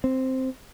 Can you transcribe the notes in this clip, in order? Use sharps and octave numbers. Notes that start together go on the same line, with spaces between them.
C4